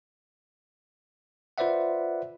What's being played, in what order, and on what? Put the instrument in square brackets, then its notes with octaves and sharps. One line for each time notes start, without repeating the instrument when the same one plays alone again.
[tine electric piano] F4 B4 C5 D5 E5 F#5